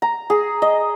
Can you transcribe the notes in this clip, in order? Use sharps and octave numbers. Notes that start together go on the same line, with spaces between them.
A#5
G#4
D#5